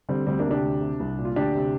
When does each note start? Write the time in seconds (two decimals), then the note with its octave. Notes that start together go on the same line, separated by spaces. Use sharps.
0.09 D3 G3 C4
0.27 D2 G3 C4
0.39 A#3 D4
0.45 C3
0.51 D4 G4
0.63 D2
0.81 C3
1.00 C2
1.18 A#2
1.25 F4
1.36 D2 D4 G4
1.54 C3